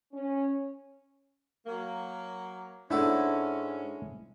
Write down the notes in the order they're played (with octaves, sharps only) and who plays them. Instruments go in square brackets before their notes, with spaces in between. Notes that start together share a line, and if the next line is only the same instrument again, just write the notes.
[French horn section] C#4
[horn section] F#3 A#3
[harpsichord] G#2 A4 F#5 [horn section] G#3 C#4 [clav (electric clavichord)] D4 E4